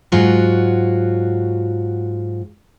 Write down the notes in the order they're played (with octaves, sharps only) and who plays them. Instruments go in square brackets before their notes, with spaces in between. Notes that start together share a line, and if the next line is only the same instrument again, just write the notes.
[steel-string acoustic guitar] G#2 F#3 F4 F#4